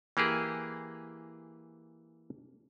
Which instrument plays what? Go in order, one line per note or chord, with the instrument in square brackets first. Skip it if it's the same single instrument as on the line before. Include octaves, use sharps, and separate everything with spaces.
[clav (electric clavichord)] E3 A#3 G4 G#4